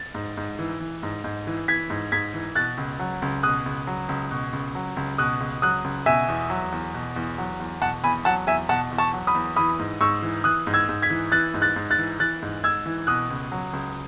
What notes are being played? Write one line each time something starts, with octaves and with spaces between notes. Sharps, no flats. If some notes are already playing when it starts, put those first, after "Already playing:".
Already playing: A6
G#2
G#2
E3
E3
G#2
G#2
E3
E3 G#6 B6
G#2
G#2 G#6 B6
E3
B2 F#6 A6
C#2
F#3
C#2
B2 D#6 F#6
C#2
F#3
C#2
B2
C#2
F#3
C#2
B2 D#6 F#6
C#2
F#3 D#6 F#6
C#2
B2 E5 G#5
E2
F#3
E2
B2
E2
F#3
E2
B2 F#5 A5
E2 G#5 B5
F#3 F#5 A5
E2 E5 G#5
B2 F#5 A5
E2
A5 C#6
F#3
B5 D#6
E2
E3 B5 D#6
G#2
G#2 C#6 E6
E3
E3 D#6 F#6
G#2
E6 G#6
G#2
G#6 B6
E3
E3 F#6 A6
G#2
F#6 A6
G#2
F#6 A6
E3
E3 F#6 A6
G#2
G#2 E6 G#6
E3
B2 D#6 F#6
C#2
F#3
C#2